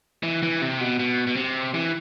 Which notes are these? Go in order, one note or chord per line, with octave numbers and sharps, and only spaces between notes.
E3
E3
C3
B2
B2
B2
C3
E3